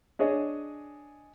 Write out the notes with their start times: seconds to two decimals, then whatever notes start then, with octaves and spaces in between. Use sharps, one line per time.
0.19 D4 G#4 C#5 D#5